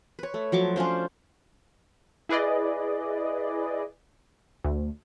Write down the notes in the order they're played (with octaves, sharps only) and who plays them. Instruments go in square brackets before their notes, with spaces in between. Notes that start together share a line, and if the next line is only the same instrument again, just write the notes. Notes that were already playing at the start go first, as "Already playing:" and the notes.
[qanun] B4 C#5
A3
F3 F#3 C#6 D6
C#4 D4 F4 C5
[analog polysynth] E4 G#4 B4 D5 D#5
D2